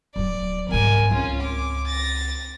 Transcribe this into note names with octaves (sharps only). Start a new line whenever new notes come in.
D1 F#3 D5
C2 G#2 A#4 G#5
C#2 C4 C#4 F4
D6
A6 A#6